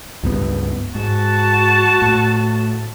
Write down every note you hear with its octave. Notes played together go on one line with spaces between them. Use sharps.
C#2 G2 B3
G#2 F#4 A5
A2